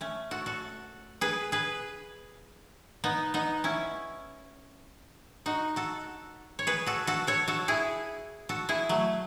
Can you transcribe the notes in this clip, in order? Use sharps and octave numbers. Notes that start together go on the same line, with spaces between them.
A3 C#4
F#4 A4
F#4 A4
G#4 B4
G#4 B4
B3 D#4
B3 D#4
C#4 E4
D#4 F#4
F#4 A4
C#5
G#4 B4
F#4 A4
F#4 A4
A4 C#5
F#4 A4
E4 G#4
F#4 A4
E4 G#4
F#3 A3